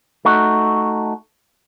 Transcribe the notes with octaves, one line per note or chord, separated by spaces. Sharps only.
A3 D#4 F#4